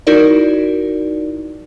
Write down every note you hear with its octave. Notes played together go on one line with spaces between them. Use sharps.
D#4 E4 F#4 A#4 D5